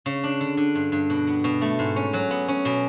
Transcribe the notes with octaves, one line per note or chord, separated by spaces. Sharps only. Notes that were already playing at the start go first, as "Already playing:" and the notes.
C#3
D4
D3
D3
G2
G2
B2
B3
B2
A3
G#2
C#4
F#3
B3
C#4
B2